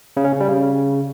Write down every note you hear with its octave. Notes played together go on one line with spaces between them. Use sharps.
C#3
C#4
C#3
G3
C#3